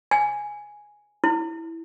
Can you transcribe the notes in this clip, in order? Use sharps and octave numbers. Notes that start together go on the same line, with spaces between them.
G#5
E4